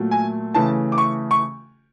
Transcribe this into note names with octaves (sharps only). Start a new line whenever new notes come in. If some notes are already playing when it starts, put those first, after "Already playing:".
Already playing: A#2 F#3 A3
G#5
C#3 E3 A3 A5
D6
C#6
C#6